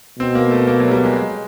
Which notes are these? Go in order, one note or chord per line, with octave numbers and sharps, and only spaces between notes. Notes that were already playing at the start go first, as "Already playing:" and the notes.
B2 C4
A#3
A3
A#3
F#3
G3
G#3